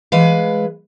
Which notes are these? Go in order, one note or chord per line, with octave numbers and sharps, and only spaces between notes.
E3 G#3 B4 F5